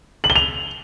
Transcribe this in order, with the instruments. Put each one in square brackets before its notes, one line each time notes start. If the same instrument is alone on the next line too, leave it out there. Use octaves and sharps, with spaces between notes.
[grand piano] F#7
G7
F7